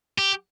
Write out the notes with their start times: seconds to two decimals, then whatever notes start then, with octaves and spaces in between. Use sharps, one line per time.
0.18 G4